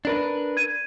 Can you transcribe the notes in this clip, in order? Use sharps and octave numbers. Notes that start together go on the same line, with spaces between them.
D4 A#4 B4
G#6 D#7